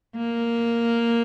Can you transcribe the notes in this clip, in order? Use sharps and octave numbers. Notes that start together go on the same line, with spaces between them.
A#3